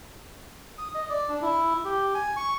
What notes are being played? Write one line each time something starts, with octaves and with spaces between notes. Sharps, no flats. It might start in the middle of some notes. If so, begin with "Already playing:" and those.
D#6
D#5
D5
D4
E4
G4
G#5
C#6